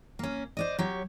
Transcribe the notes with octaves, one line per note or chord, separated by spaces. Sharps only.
A#3 C#4
C5 D5 D#5
F#3 G4 C#5